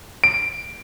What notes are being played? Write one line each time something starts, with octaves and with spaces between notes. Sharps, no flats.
D7